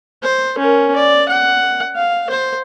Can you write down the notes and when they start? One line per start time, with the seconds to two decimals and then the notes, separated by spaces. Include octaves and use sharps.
0.23 C5
0.58 C#4 A#4
0.96 D5
1.29 F#5
1.96 F5
2.30 C5